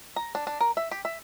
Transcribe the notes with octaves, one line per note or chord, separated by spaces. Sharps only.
A#5
D4
D4
A#4
E5
G4
E5